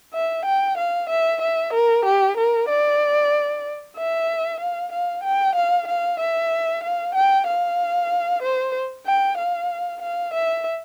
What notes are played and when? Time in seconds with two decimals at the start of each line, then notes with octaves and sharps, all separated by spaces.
0.14 E5
0.46 G5
0.78 F5
1.10 E5
1.42 E5
1.74 A#4
2.05 G4
2.37 A#4
2.69 D5
3.97 E5
4.60 F5
4.92 F5
5.24 G5
5.56 F5
5.87 F5
6.20 E5
6.84 F5
7.15 G5
7.47 F5
8.43 C5
9.06 G5
9.38 F5
10.02 F5
10.34 E5